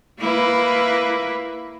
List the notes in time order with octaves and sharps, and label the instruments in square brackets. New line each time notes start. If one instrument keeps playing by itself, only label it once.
[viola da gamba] A#3 E4 B4